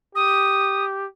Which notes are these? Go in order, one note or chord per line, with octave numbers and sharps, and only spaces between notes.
G4 D#6